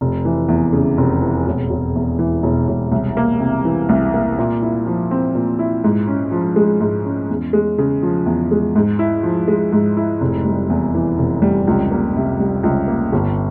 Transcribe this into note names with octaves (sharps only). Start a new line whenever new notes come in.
F1
E3
E2
C#3
F1
E3
E1
E1
E2
E3
E1
E1
C2
A#3
C3
E3
C2
A#3
A#2
E4
F3
C4
A#2
E4
G#2
C#4
F3
G#3
G#2
C#4
E2
G#3
C#3
F3
E2
G#3
G#2
E4
F3
G#3
G#2
E4
F1
G3
E2
E3
F1
G3
C#2
A#3
C3
G3
C#2
A#3
G1